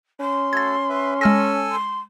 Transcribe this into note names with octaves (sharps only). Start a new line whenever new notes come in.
C#4 C6
A3 F#4 A4 G#6 A6
B4 E5
G#3 A4 G#5 E6 F6 A#6
C6